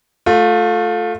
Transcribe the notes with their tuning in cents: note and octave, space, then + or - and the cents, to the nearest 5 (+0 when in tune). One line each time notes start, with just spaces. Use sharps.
A3 +0 F4 +25